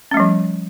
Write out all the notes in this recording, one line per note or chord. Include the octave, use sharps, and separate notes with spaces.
F3 G3 A3 C#4